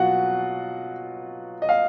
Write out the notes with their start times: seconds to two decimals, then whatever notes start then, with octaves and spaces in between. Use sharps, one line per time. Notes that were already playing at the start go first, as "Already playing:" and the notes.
Already playing: B2 F#3 F4 F#4 F#5
1.62 D#5
1.69 F5